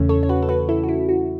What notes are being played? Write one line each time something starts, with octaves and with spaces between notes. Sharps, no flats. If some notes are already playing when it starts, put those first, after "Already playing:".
Already playing: E2 C#3 E3 A3 C#4
A4 C#5
C#5
F#4 B4
A4
F#4 B4
E4 A4
F#4
E4
F#4